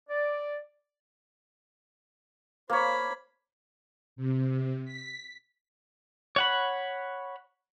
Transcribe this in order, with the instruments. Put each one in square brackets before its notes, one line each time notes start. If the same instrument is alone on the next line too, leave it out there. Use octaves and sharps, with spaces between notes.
[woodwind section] D5
[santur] A#3 C#5 [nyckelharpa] C5 B5
[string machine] C3
B6
[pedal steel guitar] C#5 F#5 B5